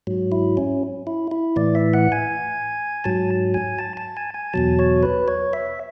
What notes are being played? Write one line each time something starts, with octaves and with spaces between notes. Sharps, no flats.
G#2 F#3
E4
C#4
E4
E4
A2 E3 D5
E5
F#5
G#5
G#2 F#3 A5
G#5
A5
A5
G#5
G#5
E2 B2 F#3 A5
C#5
B4
C#5
E5